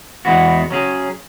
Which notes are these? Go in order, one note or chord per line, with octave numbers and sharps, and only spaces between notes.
E2 E3 G#3 B3 F#4
F#3 C#4 G#4